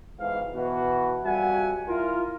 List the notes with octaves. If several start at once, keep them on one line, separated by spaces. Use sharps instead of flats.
B1 G#2 E3 F5
B2 E3 F#4
F2 G3 F#4 E5 F#5 G#5
E4 F4 A#4